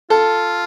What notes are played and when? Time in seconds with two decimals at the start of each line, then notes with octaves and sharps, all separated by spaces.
0.10 F4 A4